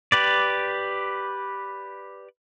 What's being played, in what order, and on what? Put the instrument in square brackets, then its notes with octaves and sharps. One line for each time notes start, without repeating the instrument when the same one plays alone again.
[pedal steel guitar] G4 B4 D5